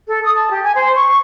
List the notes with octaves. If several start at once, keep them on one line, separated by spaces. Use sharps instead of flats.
A4
D#6
A5
G4
G#5
C5
C#6
C#6